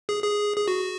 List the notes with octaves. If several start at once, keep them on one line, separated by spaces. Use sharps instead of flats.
G#4
G#4
G#4
F#4